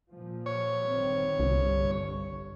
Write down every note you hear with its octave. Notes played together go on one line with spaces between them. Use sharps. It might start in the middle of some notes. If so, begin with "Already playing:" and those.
A#2 F3
C#5
G1 D#3 C4
G1 C2 G2